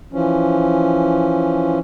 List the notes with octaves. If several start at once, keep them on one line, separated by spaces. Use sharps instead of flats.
E3 F3 C#4